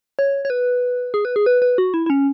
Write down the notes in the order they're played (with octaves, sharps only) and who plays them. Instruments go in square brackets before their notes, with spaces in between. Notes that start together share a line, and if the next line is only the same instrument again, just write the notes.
[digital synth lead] C#5
C#5
B4
G#4
B4
G#4
B4
B4
F#4
E4
E4
C#4